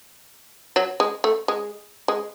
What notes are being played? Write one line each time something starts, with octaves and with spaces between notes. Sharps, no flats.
F#3
G#3
A3
G#3
G#3